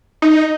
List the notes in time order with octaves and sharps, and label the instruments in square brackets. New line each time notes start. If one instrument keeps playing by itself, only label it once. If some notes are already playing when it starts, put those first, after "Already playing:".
[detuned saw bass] D#4